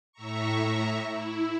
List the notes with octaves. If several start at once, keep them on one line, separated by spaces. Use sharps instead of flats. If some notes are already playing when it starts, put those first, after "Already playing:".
A2 E5 A#5 C#6
E4